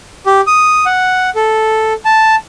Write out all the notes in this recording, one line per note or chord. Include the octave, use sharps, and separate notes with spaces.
G4
D#6
F#5
A4
A5